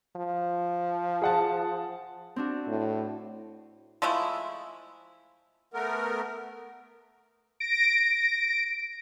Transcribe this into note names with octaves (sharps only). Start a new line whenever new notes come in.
F3
G#4 F#5 A5
C4 D4 F#4
A2
F3 G#3 A3 E4
A3 B3 A#4
A#6 D7